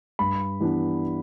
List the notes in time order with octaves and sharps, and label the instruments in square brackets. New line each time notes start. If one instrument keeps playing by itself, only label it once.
[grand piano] G2 B5
E3 G3 B3 D4